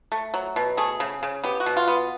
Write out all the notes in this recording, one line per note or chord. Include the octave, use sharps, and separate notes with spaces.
A3
F#3
B2
A3 G#4
C#3
C#3
B3 G4
F#4
B2
F4
B3